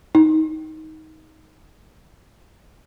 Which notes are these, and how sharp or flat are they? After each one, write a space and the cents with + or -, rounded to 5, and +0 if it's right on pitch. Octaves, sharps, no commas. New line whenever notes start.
D#4 +15